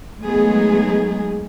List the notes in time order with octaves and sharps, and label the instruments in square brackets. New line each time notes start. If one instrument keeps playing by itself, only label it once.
[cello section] F#3 G#3 A3 B3 D#4 G#4